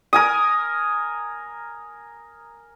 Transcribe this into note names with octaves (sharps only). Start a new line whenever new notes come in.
A#4 G#5 D#6